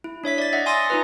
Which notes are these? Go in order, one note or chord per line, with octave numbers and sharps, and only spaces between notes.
E4
D4 C#5 E5 B6
D5 A6
D#5 E5 F#5
G#5 C6 D#6 E6 A6 A#6
D#4 F4 B4